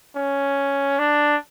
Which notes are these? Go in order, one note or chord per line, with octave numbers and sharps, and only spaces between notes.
C#4
D4